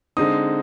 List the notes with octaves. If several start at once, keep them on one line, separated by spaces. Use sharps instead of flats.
D3 G#3 C4 D#4 D#6